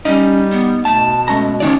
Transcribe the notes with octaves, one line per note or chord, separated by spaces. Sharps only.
G3 C#4 D#4
B3
B2 A3 A5
G#3 A3 C#4 A#5
C#2 D#3 C#4 D#4 D5